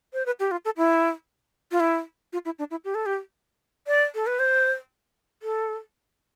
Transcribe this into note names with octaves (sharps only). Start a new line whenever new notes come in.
C5
B4
G4
F4
A4
E4
F4
E4
F4
E4
D4
E4
G4
A4
G4
D5
A4
B4
C5
A4